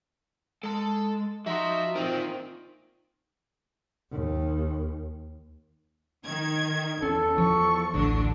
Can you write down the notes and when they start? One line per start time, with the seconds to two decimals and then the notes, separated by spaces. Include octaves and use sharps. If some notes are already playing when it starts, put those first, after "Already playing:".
0.63 G#3 A4 A5
1.46 F3 D#4 F#4 E5 C6
1.96 C4 D#4 F4 A#4 G5
4.11 D#2
6.25 D#3 G#6
7.03 E2 C#4 A4
7.38 F3 C#6
7.94 A1 D2 D3 D4